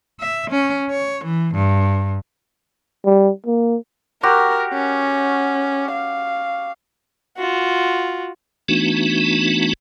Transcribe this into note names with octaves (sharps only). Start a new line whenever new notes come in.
E5
C#4
C#5
E3
G2
G3
A#3
F#4 G4 A#4
C#4
F5
F4 F#4
E3 A3 B3 D4 D#4 F#4